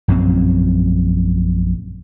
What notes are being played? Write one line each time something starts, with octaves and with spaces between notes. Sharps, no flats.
A#1 F#2 A#2 C4